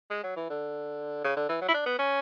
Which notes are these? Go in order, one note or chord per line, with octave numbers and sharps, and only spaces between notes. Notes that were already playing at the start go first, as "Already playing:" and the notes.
G#3
F#3
E3
D3
C#3
D3
E3
F#3
E4
D4
B3
C#4